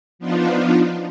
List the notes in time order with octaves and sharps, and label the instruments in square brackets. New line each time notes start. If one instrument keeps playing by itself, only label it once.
[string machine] F3 B3 D4 D#4 F4